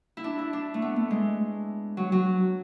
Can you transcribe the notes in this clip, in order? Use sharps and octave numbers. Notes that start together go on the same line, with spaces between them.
E4
D4
E4
D4
A3
B3
A3
G#3
F#3
F#3